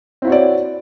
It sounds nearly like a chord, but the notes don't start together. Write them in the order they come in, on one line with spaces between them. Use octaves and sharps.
C4 E4 F#4 C#5 D5